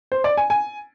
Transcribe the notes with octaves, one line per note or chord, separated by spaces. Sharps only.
C5
D5
G#5
G#5